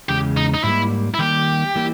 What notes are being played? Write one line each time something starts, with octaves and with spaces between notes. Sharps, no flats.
E2 C#3 G#3 G4
D#4
D#4
G#2 G3 A#3 E4
E4
D#3 G3 A#3 G4
E3 G3 A#3 E4